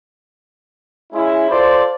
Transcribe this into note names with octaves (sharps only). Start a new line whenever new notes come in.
G#3 C#4 E4
F4 A4 C5 D5